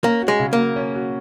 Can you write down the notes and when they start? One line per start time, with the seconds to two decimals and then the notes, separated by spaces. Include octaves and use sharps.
0.03 A#3 C#4
0.22 F#4
0.28 G#3
0.40 C#3
0.53 A#3
0.58 F#3
0.76 C#4
0.96 F#4